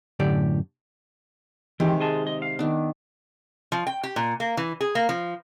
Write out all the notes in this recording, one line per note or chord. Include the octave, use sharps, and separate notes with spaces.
F#2 A2 D3 G4 D5
C3 D#3 E3 G#3 G4
G#4 D#5 A5
D#5
F5
D#3 B3 D4
F3
G5
G4
A#2
A#3
E3
G#4
A#3
F3